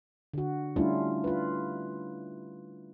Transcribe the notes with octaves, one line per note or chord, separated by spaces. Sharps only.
D3 F#4
G3 A3 C#4 D4 E4 F4
F4 B4